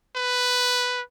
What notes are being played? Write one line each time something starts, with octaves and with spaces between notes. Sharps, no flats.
B4